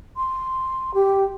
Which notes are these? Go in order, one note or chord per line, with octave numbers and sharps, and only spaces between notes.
C6
G4